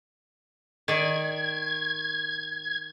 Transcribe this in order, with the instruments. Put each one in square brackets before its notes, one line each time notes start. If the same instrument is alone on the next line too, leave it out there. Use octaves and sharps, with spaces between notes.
[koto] D#3 D5 [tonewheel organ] G#6